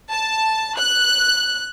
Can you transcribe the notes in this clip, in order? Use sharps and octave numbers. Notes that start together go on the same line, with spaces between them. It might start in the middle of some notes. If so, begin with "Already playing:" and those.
A5
F#6